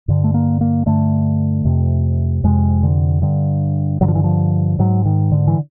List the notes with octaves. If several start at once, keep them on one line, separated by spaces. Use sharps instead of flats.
G2 D3
A3
A#3
A#3
G2 D3 A3
F2 C3
F2 C3 G#3
D3
G2 D3
G2 D3 F#3
F3
E3
F3
G#2 F#3
D#3
D3
E3